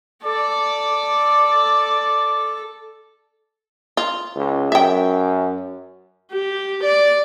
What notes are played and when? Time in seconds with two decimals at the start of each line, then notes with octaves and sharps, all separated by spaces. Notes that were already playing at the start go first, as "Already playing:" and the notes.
0.24 A4 D5
3.97 F4
4.36 C#2
4.72 F#2 E5 G5
6.32 G4
6.84 D5